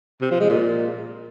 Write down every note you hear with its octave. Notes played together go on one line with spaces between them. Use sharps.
C3
F3
G#3
A#2